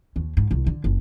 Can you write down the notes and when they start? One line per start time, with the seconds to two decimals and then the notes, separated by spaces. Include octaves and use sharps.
0.16 D#2
0.37 G#2
0.51 C2
0.66 D3
0.84 F#1